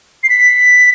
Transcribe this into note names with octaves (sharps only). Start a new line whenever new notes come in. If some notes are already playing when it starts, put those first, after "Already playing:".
C7
B6